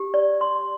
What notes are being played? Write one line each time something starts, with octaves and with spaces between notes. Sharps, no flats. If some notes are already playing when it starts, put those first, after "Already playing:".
Already playing: G4
D5
C6